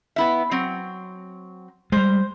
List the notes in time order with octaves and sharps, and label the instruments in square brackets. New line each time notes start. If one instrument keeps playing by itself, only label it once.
[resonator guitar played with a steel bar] B3 E4 E5
F#3 C4
[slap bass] G3 G#3 [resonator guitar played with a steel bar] C5